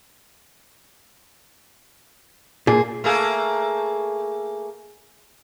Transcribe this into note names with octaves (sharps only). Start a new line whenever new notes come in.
A#2 G#4
A3 A#3 G#4